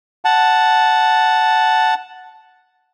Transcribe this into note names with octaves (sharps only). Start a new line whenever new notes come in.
F#5 A5